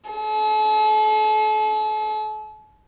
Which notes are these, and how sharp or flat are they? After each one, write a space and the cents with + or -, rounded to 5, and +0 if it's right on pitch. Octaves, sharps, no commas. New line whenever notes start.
A4 -40